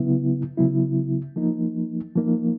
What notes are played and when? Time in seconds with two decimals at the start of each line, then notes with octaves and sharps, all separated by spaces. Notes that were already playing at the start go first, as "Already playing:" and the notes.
Already playing: C#3 F#3 B3 E4
0.57 C#3 F#3 B3 E4
1.36 F3 A#3 D#4
2.16 F3 A#3 D#4